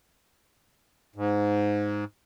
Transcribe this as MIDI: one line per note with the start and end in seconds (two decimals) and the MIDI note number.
1.16 2.04 44